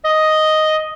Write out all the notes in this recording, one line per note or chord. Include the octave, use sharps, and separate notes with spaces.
D#5